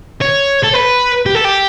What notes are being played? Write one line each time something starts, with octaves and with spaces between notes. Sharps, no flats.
C#5
A4
B4
G4
A4
G4